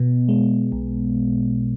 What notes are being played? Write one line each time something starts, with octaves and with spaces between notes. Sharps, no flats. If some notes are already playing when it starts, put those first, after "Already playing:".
Already playing: B2 B3
G#3
B1